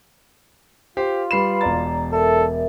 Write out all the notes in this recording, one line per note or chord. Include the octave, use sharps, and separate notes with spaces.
F4 G4 C5
G3 B4 B5 C7 E7
E1 D5 A#5 A6
A4 A#4 E5